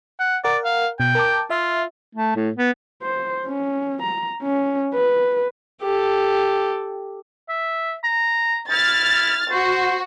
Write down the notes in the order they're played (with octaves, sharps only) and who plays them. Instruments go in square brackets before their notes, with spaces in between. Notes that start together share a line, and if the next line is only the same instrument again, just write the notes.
[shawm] F#5
[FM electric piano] A#4 F#5 [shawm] D5
[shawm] F5
[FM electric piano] B2 [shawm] G5
[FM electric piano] A#4 A5 D6
[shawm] F4 [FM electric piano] E5
[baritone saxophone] A3
A2
B3
[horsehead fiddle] C5
C#4
A#5
C#4
B4
[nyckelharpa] G4 A4
[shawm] E5
A#5
[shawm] E4 [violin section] F6 A6
[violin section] F#4 [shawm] C5